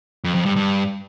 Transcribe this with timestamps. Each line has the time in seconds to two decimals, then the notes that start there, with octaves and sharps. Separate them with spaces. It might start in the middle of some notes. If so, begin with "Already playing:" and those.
0.24 F2
0.35 F2
0.46 G2
0.56 G2